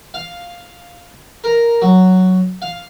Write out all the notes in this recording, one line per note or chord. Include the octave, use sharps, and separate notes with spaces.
F5
A#4
F#3
F5